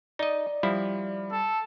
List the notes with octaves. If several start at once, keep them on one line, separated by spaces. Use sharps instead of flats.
D#4 D5 D#5
F3 G3 E4
A4